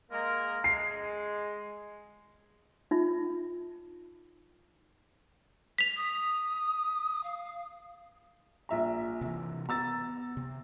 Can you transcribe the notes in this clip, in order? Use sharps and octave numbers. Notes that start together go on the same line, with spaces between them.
G#3 A#3 A#4
G#3 C7
D#4 F4
B6 F7
D#6
F5
A#1 E5 A#5
C3 E3
B3 A#5 E6 A6
C3